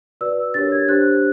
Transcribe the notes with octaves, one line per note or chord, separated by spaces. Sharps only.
F#4 B4 D5 E6
D4 G4 A#4 C#5 A6
G#6
D4 G4 C5 F#6